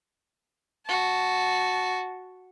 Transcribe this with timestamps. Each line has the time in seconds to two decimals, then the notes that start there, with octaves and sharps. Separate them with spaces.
0.86 F#4 A5